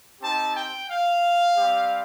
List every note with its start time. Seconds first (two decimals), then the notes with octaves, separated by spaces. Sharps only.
0.21 C4 D#4 G4 A5
0.55 G5
0.89 F5
1.56 G3 C4 G4